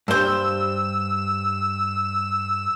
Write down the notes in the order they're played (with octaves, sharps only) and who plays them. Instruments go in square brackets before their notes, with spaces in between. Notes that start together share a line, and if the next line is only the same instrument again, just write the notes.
[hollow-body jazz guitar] G2 C5 [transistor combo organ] E6